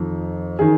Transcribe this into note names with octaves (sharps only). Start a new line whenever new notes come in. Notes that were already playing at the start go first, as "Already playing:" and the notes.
Already playing: F2 D#3
D#3 G#4